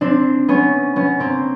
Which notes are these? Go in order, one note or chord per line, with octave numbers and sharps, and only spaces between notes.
C4 D4
B3 C#4
B3 C#4
A#3 C4